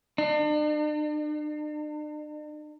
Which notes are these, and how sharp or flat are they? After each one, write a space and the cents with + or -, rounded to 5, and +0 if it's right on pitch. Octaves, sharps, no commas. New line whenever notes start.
D4 +45